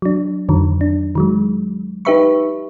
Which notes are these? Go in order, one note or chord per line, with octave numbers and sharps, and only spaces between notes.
F#3 D4
F2 D3 D#3 F#3
D4
D#3 F#3 G#3
D#4 G4 B4 E5 B5 C#6